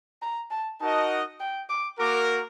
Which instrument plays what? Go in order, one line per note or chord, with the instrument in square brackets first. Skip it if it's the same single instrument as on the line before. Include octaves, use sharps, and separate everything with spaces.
[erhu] A#5
A5
[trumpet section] D#4 F#4 A#4 D#5 F#5 [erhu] A5
[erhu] G5
D6
[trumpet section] A#3 F#4 A#4 [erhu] D6